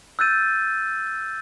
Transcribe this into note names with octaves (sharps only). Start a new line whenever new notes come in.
E6 F#6 G6 A6 D#7